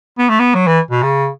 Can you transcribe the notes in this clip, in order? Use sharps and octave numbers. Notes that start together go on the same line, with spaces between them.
B3
A3
B3
F#3
E3
B2
C#3